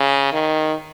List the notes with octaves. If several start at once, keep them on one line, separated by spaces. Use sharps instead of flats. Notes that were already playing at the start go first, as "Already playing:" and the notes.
Already playing: C#3
D#3